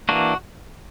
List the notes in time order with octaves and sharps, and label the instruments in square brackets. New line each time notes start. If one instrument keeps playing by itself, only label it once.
[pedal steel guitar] E3 A#3 D4 F#4